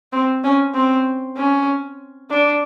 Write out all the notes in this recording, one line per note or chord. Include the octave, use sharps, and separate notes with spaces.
C4
C#4
C4
C#4
D4